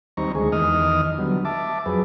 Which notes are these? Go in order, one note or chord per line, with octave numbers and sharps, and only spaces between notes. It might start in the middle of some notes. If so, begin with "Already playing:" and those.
D#2 G3 C4 D#4 A#5 C#6
D2 G#3 G#4
E2 D#3 D#5 D#6 F6
D3 F#3 G3 B3
E5 A5 D6
F2 F#3 G#4 B4